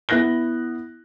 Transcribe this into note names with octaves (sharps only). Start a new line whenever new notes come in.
B3 E4 F#6 A#6 G7